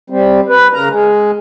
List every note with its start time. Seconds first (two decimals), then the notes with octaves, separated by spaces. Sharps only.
0.10 G3 C4
0.49 B4
0.73 C#3 A#4 A#5
0.89 G#3